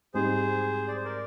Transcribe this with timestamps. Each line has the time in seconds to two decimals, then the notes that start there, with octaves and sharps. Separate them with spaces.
0.14 G#2 G3 C4 D#4 G#4 C5
0.88 D5
0.97 C5
1.05 A#4 D5